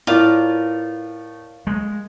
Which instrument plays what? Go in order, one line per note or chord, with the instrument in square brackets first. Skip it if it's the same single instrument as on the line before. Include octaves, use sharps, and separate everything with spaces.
[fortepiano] A2 [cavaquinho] F4 [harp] A#4 B4 D5
[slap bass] G#3